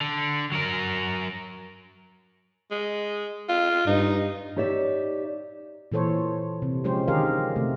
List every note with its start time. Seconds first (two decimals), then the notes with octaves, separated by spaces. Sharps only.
0.01 D3
0.52 F#3 A#4
2.71 G#3
3.49 F4
3.87 G2 D#4
4.56 D#4 G4 C#5 D5 E5
5.92 A#2 E3 A4 C5 C#5
6.62 C3
6.84 F3 G#3 C#4 G4 C5
7.08 D3 D#3 G4 G#4 A#4 F5
7.56 C3 A3